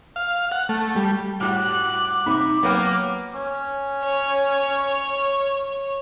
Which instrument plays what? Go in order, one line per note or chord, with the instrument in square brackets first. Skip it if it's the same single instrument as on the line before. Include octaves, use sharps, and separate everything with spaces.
[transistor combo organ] F5
F#5
A3
G3
[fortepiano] A2 G3 F#4 [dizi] D6 [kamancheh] F#6
[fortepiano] C3 B5 [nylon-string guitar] D#4 E5
[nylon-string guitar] F#3 [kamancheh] A#3 [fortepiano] B3 B4 G5
[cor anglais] C#4
[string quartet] C#5